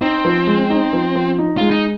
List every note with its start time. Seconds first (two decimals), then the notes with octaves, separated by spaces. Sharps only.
0.01 C4 D#4
0.25 F3
0.47 G#3
0.70 D#4
0.93 F3
1.15 F3
1.39 D#4
1.57 G#3 F4
1.71 D#4